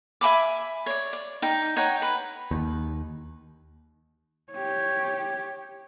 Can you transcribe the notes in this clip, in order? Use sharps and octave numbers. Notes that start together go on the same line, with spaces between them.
E5 G#5 B5 D6
C#5 D5
D5
D#4 G5
D#4 C#5 F#5 G5
B4
D#2
G4 C#5